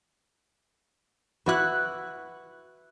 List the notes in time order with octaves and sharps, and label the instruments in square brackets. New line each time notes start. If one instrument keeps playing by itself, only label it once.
[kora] E4 F#4 B4 [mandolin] C#6 F#6